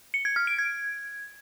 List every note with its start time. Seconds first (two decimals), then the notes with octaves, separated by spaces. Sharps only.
0.14 C#7
0.25 G#6
0.36 F6
0.47 D7
0.58 G#6